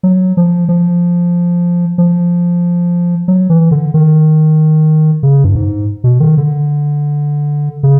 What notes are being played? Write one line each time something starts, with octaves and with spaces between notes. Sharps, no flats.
F#3
F3
F3
F3
F#3
E3
D3
D#3
C#3
G2
G#2
B2
D#3
D3
C#3